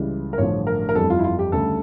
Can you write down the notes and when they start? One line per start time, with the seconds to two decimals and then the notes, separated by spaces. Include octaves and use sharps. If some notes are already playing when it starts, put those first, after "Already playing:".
Already playing: C#2 C#3 E3 G3
0.33 A#4
0.38 A1 G2 D3 F3 C#5
0.67 A#4
0.89 A#4
0.95 G1 F2 E3 G3 A4
1.10 F4
1.19 E4
1.24 F4
1.39 G4
1.52 D2 C#3 G3 A4